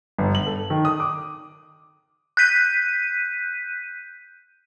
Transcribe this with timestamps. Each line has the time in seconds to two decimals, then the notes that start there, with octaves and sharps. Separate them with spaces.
0.18 G1
0.35 F#7
0.47 A4
0.70 D#3
0.85 D#6
1.00 D6
2.37 F#6 G6 B6 D#7